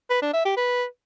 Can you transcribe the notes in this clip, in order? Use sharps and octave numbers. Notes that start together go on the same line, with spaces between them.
B4
D4
E5
G4
B4